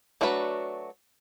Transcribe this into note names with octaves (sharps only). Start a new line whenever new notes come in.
F#3 A3 D4 F#4 B4